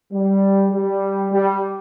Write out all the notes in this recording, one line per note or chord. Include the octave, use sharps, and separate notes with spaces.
G3
G3
G3